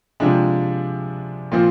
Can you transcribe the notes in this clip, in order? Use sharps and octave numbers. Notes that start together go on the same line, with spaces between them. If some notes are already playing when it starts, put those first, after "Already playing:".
C3 F3 G#3 D4
A#2 F3 C4